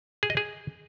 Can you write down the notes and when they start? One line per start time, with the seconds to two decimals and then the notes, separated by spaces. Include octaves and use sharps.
0.23 G#4
0.30 D#5
0.37 G#4